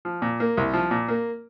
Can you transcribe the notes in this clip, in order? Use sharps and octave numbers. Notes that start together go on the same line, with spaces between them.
F3
A#2
A#3
C2
F3
A#2
A#3